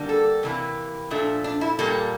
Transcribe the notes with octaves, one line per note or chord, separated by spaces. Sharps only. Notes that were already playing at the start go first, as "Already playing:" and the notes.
Already playing: D3 G3 A#3
A4
C3 E3 A#3
A#2 F3 A3 D4
D4
E4
A#2 G3 A#3 A4